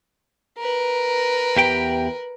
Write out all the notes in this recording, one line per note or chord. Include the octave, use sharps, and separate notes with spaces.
A#4 B4
E2 G4 G5